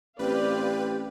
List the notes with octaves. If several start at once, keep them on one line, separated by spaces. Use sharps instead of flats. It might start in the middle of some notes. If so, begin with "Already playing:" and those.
A1 C4 G4 B4 D5 F5